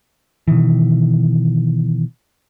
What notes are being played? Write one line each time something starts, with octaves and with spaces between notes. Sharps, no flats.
B2 D#3 E3